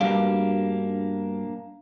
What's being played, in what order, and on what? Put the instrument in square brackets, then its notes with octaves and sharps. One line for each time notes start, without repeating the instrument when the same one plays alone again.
[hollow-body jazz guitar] G2 B2 G3 [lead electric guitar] A#3 D4 [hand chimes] F5